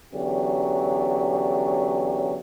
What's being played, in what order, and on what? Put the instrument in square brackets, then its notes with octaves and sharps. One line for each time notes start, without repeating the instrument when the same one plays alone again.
[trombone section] E2 D3 F#3 C#4 G4